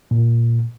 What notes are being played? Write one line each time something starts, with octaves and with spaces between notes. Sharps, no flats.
A#2